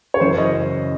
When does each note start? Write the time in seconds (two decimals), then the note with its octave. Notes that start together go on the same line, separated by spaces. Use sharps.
0.14 C#5
0.20 F#2 C#3 E3 C5
0.38 D#5